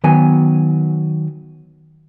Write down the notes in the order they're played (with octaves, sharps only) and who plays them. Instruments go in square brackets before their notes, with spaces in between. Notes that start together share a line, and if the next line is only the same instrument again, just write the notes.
[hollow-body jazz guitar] D#3 F#3 B3 G#5